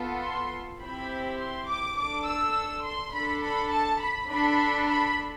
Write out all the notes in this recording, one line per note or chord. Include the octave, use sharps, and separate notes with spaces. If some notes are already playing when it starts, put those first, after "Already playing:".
Already playing: B3 F4 A4
C6
C4 E4 G4 B5
C6
D6
D4 A4 D6
E6
C6
D4 A4 B5
B5
A5
B5
D4 A4 B5
B5